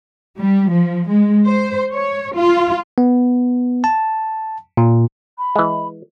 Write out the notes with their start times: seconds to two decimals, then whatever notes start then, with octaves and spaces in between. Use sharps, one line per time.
0.39 G3
0.71 F3
1.09 G#3
1.47 C5
1.92 C#5
2.35 F4
2.98 B3
3.84 A5
4.77 A#2
5.38 B5
5.56 E3 G#3